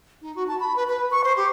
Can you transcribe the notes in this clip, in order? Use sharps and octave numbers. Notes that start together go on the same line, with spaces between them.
D#4
F#4
A5
B5
B4
B4
C#6
C5
G4